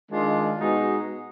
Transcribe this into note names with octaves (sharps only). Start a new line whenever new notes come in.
D#3 G#3 D4 F4
B2 G#3 D#4 F#4